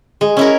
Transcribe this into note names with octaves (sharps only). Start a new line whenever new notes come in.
G#3
C#4 E4 A#4